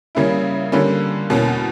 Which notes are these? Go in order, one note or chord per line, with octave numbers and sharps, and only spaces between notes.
C#3 G3 A#3 C#4 E4
D3 G3 A#3 C#4
E2 B2 A#3 C#4